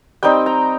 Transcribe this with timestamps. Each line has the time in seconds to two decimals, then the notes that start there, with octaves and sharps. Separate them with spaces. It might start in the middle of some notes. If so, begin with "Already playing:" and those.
0.23 G3 C4 D#4 G5
0.46 A#5